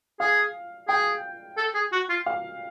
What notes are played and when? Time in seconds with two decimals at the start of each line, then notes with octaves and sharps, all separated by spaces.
0.20 G#4 F5
0.88 G#4 G5
1.57 A4
1.75 G#4
1.92 F#4
2.09 F4
2.26 F5